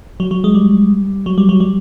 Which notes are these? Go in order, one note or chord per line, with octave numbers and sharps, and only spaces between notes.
F#3
F#3
G#3
G3
F#3
G3
F#3
G3